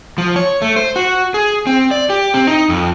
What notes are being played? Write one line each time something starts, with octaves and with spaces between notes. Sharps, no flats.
F3
C#5
A3
C5
F#4
G#4
C4
D5
G4
C4
D#4
F2